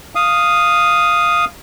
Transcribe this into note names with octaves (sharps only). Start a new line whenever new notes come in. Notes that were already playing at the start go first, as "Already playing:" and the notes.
F5 D#6